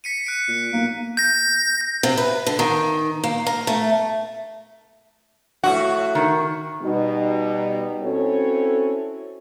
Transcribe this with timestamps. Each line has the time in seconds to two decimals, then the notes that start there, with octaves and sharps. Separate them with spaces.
0.04 B6 C#7 D#7
0.27 F#6 D7
0.48 A#2
0.73 B1 A#3
1.17 G6 A#6
2.03 C3
2.18 B4
2.47 D3
2.59 D#3
3.24 A#3
3.47 A#4
3.67 A3
5.64 A2 C3 F#4 F#5
6.15 D#3
6.82 B2 G3 D#4
8.02 C4 C#4 E4 F#4 A4 C#5